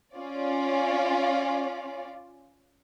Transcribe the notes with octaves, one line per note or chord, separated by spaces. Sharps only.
C#4 F4 D5